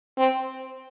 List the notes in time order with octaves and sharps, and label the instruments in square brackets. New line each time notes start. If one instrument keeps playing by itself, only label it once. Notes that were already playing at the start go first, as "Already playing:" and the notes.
[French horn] C4